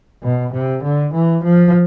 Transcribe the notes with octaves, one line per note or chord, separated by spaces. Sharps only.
B2
C3
D3
E3
F3